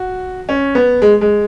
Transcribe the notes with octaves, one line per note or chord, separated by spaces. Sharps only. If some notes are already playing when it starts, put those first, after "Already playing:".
Already playing: F#4
C#4
B3
G#3
G#3